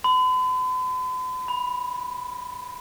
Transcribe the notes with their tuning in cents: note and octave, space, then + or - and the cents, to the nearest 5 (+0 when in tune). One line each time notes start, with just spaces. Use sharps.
B5 +45
B5 -5